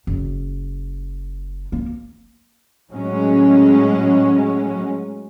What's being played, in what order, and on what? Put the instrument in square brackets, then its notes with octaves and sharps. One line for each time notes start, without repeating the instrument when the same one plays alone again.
[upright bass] F#1
A#3
[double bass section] A2 F#3 G#3 C#4